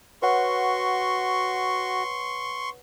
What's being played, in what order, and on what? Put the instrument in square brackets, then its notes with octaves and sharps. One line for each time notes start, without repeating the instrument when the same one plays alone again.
[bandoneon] F#4 [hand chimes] B4 C#5 F#5 [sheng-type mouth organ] C6 C#6